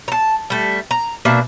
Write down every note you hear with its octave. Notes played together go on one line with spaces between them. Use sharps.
A5 A#5
G3 A3
A#5
B2 A#3 D4 E5